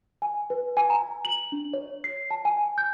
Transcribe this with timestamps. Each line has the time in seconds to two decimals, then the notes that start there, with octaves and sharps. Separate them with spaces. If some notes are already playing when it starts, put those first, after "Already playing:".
0.22 G#5
0.50 B4
0.77 G#5
0.90 A#5
1.25 F#7
1.52 D4
1.73 C#5
2.04 C7
2.31 A5
2.45 G#5
2.78 G6